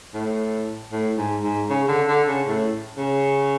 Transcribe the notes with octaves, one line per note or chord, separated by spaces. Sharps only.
A2
A2
G#2
G#2
C#3
D3
D3
C#3
A2
C#3